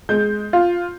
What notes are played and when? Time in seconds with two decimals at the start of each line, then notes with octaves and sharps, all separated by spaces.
0.09 G#3 G6
0.53 F4